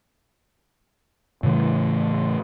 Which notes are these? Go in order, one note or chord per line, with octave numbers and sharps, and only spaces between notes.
A2 C#3 E3 A3